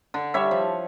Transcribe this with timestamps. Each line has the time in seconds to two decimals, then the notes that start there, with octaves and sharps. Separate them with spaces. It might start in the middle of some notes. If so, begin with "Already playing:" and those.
0.14 D3
0.34 G3 C#5 E5
0.51 F3